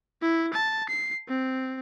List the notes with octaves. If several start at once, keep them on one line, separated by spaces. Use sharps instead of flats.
E4
A5
C7
C4